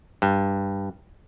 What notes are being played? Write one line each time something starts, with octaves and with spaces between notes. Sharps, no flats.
G2